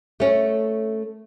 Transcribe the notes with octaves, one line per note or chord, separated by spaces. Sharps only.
A3 C#4